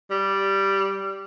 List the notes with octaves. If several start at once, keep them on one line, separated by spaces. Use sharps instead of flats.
G3